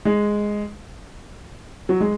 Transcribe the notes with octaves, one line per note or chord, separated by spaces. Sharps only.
G#3
F#3
G#3